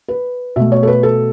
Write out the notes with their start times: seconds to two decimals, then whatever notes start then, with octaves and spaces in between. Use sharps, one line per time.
0.08 B4
0.56 B2 A3 E5
0.72 C#5
0.83 A4
0.87 B4
1.03 A4